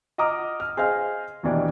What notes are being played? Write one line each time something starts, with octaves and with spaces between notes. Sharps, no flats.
D#5 F#5 A#5 D6 D#6 F6
F6
G#4 C5 D#5 F5 G#5 F6
D#2 B2 E3 D4 D#4